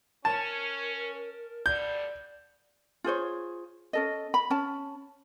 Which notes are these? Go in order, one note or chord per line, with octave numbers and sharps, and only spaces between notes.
C#4 A#4 A5
B2 D3 G3 D5 G6
F4 G#4 C5 C#5
C#4 A4 D#5
B5
C#4 A5